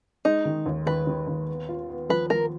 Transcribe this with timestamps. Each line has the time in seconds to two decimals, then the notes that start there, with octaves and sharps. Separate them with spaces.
0.25 G#3 D#4
0.45 D#3
0.66 D#2
0.86 D#3 B4
1.07 D#3
1.27 D#2
1.48 B3
1.69 F4
1.90 B3
2.09 F3 B4
2.30 F3 A#4